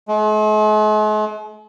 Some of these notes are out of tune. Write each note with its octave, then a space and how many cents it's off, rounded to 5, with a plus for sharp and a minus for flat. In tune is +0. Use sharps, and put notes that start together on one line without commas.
G#3 +45